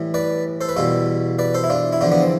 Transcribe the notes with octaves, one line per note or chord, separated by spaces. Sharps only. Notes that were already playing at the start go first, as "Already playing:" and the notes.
Already playing: A2 E3 G3
B4 D5
A4 C5
B4
E2 B2 G3 F4 A4
B4 D5
A4 C5
E4
D4 F4
E4
E2 D3 F3 D4 F4
B3 D4
C4